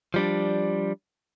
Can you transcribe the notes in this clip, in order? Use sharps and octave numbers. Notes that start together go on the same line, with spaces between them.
F3 G3 D4